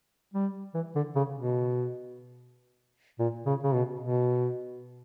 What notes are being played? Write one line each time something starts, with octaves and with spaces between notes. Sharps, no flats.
G3
E3
D3
C#3
B2
A#2
C#3
C#3
B2
B2